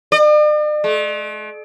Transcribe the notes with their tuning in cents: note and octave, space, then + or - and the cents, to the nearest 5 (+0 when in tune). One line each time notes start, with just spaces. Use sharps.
D5 +45
A3 -45